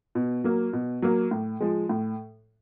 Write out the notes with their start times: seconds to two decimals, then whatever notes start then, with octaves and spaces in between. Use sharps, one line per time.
0.15 B2
0.44 F#3 A#3
0.73 B2
1.02 F#3 A#3
1.31 A2
1.60 F3 G#3
1.89 A2